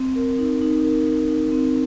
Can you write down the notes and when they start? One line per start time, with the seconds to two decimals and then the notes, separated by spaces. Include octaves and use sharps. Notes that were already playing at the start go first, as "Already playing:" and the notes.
Already playing: C4
0.16 A#4
0.38 D#4
0.62 D#4
0.84 A#4
1.07 D#4
1.29 D#4
1.51 C4